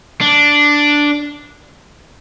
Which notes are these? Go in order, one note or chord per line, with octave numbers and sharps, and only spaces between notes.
D4